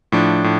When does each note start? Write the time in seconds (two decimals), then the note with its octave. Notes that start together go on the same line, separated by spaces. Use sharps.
0.12 A2 F3 D4
0.44 A2